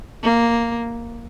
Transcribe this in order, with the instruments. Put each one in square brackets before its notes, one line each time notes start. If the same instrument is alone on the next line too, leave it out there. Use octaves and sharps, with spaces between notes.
[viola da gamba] A#3